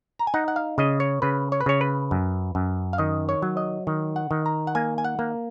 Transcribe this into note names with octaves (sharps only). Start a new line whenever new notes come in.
A#5
G#5
D#4 F#5
F#5
F5
C#3 D#5
C#5
C#3 B4
C#5
B4
C#3 C#5
B4
F#2
F#2
F5
D#3 D#5
C#5
F#3
D#5
D#3
F#5
D#3
A#5
F#5
A#3 G#5
G#5
F#5
A#3